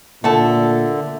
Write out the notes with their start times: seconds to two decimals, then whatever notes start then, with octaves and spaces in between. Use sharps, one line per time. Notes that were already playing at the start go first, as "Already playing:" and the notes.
0.24 A#2 D3 A3 F#5 A5